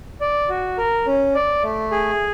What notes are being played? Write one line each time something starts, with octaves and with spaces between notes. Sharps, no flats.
D5
F#4
A#4
C#4
D5
A3
G#4